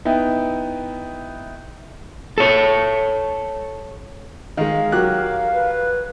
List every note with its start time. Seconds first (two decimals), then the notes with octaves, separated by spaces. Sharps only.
0.05 B3 D#4 E4 G5
2.38 A4 C#5
4.57 D#3 G#3 F5
4.92 F#3 G4 A#4 F#6
5.53 B4